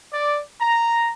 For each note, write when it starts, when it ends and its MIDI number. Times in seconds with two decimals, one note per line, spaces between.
0.12 0.42 74
0.61 1.12 82